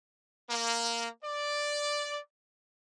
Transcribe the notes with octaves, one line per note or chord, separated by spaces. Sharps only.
A#3
D5